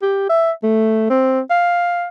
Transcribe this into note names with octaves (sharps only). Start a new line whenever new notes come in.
G4
E5
A3
C4
F5